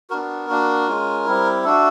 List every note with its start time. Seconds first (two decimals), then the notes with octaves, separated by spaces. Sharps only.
0.10 B3 D4 F#4 A#4
0.49 A#3 D4 F#4
0.87 G#3 C#4 F4
1.26 G3 C4 E4
1.64 A3 D4 F#4 A4